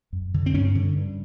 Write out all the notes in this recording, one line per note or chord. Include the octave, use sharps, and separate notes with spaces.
F#2
D3
C4
G2 C#4
D3
G2